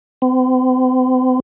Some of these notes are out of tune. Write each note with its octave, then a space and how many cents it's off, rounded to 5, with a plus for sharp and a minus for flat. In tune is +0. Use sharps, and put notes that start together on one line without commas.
C4 -40